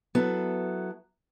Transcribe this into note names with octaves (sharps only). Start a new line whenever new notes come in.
F#3 B3 E4 A4